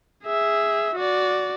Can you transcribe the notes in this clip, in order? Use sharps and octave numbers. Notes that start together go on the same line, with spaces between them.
G#4 E5
F#4 D5